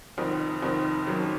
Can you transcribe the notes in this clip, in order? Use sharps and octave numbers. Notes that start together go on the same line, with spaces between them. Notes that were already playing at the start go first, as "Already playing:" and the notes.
F1 F2 D#3
F1 F2 D#3
F#1 F#2 D#3